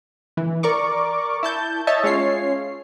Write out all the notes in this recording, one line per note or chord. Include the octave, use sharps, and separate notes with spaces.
E3
A#4 D5 C#6 D6
E4 A5 G6
C#5 D#5 E5 A5
G#3 C#4 F4 C#5 C7